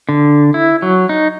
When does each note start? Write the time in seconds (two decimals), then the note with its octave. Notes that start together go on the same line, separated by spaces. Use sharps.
0.09 D3
0.54 E4
0.82 F#3
1.09 D#4